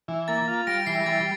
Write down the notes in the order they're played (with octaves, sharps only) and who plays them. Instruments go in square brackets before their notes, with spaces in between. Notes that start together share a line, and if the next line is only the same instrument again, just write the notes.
[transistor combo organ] E3
[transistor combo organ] A#3 [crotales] A6
[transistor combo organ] F4
[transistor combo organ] G3 [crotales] A#6 D7
[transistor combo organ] E3 [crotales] C7
[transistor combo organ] G3 [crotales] A6